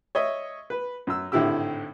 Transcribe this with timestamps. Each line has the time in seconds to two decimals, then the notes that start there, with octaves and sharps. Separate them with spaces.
0.15 C#5 D#5 E5 D#6
0.70 B4
1.07 F#2 E6
1.32 G#1 A2 D3 E4 G4 E6